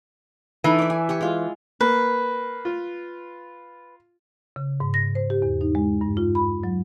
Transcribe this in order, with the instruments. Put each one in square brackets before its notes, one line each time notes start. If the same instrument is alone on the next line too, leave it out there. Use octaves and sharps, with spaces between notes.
[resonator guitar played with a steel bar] E3 [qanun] D#4 A4 D#5
[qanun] D5 E5
G#5
G4 G#5 C#6
G#3 F4
[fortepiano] A#3 [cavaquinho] B4
[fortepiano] F4
[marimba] C#3
G#2
A#6
C5
G4
E2
D#4
G#3
G2
F4
B5
F#3